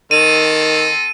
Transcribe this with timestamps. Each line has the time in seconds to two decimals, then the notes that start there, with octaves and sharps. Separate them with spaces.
0.11 D#3 C4 A4 D#7